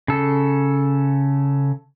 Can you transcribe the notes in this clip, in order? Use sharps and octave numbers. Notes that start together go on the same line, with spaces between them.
C#3 A4